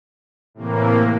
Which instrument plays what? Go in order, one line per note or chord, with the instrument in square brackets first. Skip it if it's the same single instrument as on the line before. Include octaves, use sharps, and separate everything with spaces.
[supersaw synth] A2 C3 E3 A#3